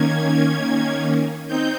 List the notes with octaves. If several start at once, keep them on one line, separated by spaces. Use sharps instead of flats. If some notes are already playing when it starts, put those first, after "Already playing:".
Already playing: D#3 A#3 C#4 G#6
C4 D#4 G6